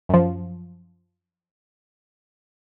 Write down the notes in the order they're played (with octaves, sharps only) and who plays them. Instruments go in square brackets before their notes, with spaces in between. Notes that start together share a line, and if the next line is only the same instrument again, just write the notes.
[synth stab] F#2 F3